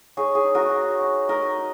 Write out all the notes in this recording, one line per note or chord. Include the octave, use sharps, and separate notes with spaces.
D#4 G#4 C#5
G#4
D#4
F#4 A#4
D#4
D#4
D#4 A#4 D#5
D#4